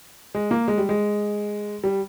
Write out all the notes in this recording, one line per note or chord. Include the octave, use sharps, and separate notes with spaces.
G#3
A#3
G#3
G3
G#3
G3